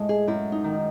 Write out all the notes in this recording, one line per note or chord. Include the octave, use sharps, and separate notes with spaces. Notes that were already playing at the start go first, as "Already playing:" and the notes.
Already playing: A2 G#3
G#4
F#2 E4
D#4
D#3